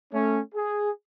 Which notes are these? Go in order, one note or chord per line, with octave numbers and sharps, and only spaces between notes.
A3 C#4
G#4